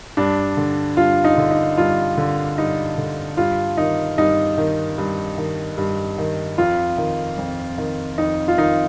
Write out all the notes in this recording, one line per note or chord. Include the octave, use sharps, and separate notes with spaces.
G2 D4
D3
G2 F4
D#4
D3
D#4
G2 F4
D3
G2 D#4
D3
G2 F4
D#3 D#4
G2 D#4
D#3
G2
D#3
G2
D#3
F2 F4
D#3
F2
D#3
F2 D#4
F4
D#3 D#4